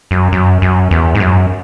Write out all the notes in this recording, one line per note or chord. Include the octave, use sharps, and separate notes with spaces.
F#2
F#2
F#2
E2
G#2
F#2